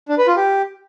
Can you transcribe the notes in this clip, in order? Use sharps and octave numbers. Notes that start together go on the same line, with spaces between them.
D4
B4
F4
G4